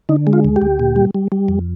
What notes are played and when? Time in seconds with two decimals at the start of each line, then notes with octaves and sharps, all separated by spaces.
0.09 D3 D#4
0.27 G#3
0.33 F4
0.45 D2
0.56 G4
0.62 D2
0.79 A#2
0.96 G3
1.15 G3
1.32 G3
1.48 F2